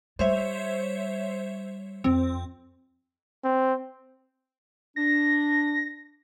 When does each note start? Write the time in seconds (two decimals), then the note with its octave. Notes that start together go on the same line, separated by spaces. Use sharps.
0.19 G3 C5 C#5 E5
2.04 F2 C4
3.44 C4
4.96 D4 A#6